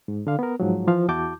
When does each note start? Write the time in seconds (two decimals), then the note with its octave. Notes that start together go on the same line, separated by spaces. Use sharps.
0.08 G#2
0.27 D3 F5
0.39 B3 A#4
0.60 G#2 F3 F#3
0.87 E3 F3 F5
1.08 E2 E4 F#4 A5 D6 G6